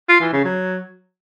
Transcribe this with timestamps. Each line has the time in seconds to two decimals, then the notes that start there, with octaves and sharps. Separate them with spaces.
0.09 F4
0.21 E3
0.33 C#3
0.45 F#3